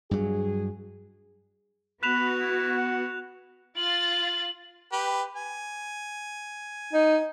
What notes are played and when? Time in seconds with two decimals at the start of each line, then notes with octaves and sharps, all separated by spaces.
0.11 G2 F#3 G#4
2.03 B3 F#4 B5 F#6 E7 F7
2.39 E4
2.77 F#5
3.76 F4 A6 F#7
4.92 G4 B4
5.36 G#5
6.93 D#4